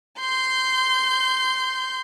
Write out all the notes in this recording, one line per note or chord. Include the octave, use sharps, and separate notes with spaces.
C6 G6